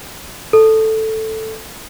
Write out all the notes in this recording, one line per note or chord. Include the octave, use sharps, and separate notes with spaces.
A4